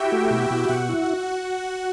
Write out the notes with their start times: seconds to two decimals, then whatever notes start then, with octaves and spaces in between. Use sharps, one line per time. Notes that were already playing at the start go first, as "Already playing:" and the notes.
Already playing: E4 F#4 G4 E5 G5
0.12 A3
0.30 B2
0.51 B2
0.69 B2 F#4 F#5
0.89 E4